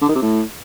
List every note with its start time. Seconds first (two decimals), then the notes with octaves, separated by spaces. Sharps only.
0.02 D3
0.08 D#3
0.15 C3
0.22 A2